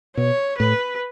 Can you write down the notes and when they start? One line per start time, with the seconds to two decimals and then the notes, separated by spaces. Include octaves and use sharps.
0.17 B2 C#5
0.59 A2 B4